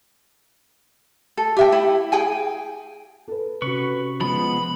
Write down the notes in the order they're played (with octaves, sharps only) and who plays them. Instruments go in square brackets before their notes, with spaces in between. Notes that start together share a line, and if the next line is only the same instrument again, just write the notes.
[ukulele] A4
G4 E5 G5
E4
G#4 G5 G#5
[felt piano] A4 B4
[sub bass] C3 [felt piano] C#4 F#4 [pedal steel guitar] B4 C#6
[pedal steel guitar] F3 G#3 B3 [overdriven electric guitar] B5